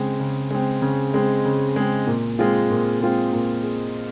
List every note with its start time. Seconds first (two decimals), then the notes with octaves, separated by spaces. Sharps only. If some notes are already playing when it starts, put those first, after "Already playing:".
Already playing: C#3 G#3 C4
0.20 C#3
0.51 G#3 C4
0.82 C#3
1.14 G#3 C4
1.45 C#3
1.76 G#3 C4
2.07 A#2
2.39 G#3 C4 F4 G#4
2.70 A#2
3.01 G#3 C4 F4 G#4
3.33 A#2
3.63 G#4